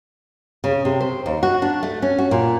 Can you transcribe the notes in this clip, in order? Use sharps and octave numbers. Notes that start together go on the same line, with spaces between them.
C#3
C3
C5
D#2
F#4
D4
A3
C#4
F#4
A#2